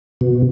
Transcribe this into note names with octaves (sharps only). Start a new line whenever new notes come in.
B2